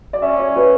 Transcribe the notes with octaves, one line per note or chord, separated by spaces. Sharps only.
D5
C#4 E5
C#5
B4